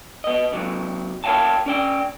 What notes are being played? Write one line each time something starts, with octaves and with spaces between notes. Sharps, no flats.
B3 D#5
C3 F#3
A#4 C#5 D5 F5 G5 A5
C#4 D5 G5